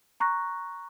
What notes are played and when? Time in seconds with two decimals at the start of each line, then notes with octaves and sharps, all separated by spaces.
0.20 A#5 C#6 F#6 A#6